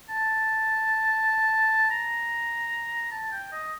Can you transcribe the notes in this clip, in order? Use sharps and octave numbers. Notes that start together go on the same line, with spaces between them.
A5
A#5
A5
G5
D#5